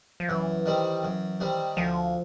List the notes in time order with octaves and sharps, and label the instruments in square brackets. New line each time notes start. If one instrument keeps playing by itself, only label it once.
[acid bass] F3
[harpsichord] F#2 [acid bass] E3
[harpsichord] D#3 G3 C4
F#2
D#3 G3 C4
[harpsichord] D2 [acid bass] F3